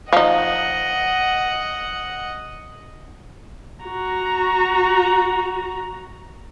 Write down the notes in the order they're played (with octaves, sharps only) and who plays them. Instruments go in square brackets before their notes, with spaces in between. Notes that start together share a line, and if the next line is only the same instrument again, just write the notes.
[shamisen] F3 D#4 [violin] D#5 F#5
[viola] F#4 A#5